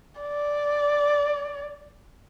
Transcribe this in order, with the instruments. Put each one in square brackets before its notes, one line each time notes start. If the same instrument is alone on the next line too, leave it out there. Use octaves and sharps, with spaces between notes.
[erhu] D5